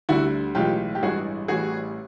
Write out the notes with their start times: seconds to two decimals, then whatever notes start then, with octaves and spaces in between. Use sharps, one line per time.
0.09 D2 D3 G3 E4 F#4
0.55 B1 A2 E3 G#3 F4 G4
0.95 G4
1.03 A1 G2 E3 G#3 F#4 G#4
1.48 A1 A2 E3 G3 F#4 G#4